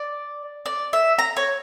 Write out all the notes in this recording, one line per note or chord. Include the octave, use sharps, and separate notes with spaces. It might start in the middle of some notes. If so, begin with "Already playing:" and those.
Already playing: D5
D5
E5
A#5
C#5